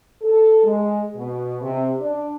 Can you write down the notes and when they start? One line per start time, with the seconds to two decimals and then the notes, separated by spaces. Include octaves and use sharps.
0.22 A4
0.64 G#3
1.15 B2
1.61 C3
2.00 D4